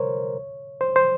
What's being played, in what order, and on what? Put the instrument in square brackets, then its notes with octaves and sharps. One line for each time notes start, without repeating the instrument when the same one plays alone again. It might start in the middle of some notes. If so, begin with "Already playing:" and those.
Already playing: [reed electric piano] A#4 C5 C#5
C5
C5